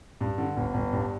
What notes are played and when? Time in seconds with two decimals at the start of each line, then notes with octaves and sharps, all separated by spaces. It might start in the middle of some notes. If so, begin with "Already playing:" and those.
0.21 G2
0.38 D3
0.57 G1
0.74 G1
0.93 G2